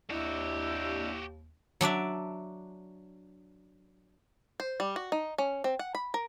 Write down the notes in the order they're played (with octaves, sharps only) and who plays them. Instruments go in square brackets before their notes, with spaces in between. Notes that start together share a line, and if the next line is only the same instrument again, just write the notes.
[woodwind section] D#2 [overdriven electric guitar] D4 D#5 [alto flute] E4 [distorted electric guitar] F#4 G4
[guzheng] F#3 D4 D5 E5
[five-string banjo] C5
G3
F#4
D#4
C#4
C4
F#5
B5
A#4